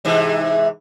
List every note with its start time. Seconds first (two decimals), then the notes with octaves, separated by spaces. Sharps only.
0.05 G#2 C3 E3